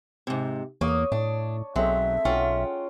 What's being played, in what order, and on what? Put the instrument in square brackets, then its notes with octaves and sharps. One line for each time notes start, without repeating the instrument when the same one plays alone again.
[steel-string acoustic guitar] G#2 C3
[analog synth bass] E2 [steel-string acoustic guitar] A#3 [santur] C#5 D#6
[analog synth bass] A2 [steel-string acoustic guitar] D4
[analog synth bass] B1 [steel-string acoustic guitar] F#3 [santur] G#3 C4 A4 [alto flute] E5
[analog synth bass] B1 [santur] C#4 [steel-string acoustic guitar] F4 F#5 G5